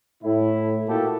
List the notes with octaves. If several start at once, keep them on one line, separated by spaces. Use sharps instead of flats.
A2 E4
A#2 A#3 E4 F#4 G4 A4